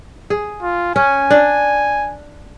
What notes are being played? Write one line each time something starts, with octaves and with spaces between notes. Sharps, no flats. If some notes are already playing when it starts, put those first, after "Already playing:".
G#4
F4
C#4 G#5
D4